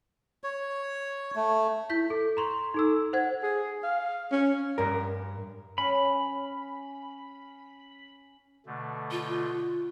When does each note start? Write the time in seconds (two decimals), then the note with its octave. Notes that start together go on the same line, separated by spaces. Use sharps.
0.44 C#5
1.36 A3
1.90 E4 G6 B6
2.10 A4
2.37 A#5 C6 C#6
2.74 D#4 A4 E6
3.13 C5 F#5 G#6
3.43 G#4
3.83 F5
4.32 C#4
4.78 G2 A#4
5.78 C#4 B5
8.66 B2 D3 A3
9.11 F4